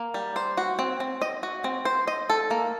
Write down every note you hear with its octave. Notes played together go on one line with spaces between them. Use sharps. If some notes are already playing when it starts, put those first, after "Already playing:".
Already playing: A#3
G3
C5
F#4
C4
C4
D#5
F#4
C4
C5
D#5
A4
A#3